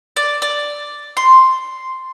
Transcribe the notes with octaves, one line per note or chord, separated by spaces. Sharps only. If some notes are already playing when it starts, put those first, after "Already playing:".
D5
D5
C6